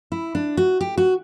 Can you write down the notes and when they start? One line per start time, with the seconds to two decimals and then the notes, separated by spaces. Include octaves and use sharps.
0.12 E4
0.35 D4
0.57 F#4
0.81 G4
0.98 F#4